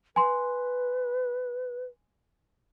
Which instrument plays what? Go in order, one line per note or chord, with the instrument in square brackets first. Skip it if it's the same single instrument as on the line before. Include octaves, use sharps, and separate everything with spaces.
[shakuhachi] B4 [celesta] G#5 C6